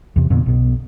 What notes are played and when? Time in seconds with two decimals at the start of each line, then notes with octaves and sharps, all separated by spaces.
0.16 E2 C3
0.30 F2 A#2 D3 B3
0.46 B1 B2